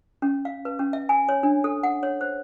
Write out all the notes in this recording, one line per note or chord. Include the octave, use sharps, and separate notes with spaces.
C#4
F5
B4
C#4
E5
G#5
C#5
D4
A4
F#5
C#5
C5